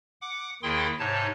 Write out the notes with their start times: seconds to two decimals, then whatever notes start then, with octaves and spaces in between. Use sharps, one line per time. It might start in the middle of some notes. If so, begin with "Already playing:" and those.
0.21 F#5 D6
0.63 D#2 D#3 E4 G#4 G5 C6
0.99 G#2 C3 D#4 C#5 A5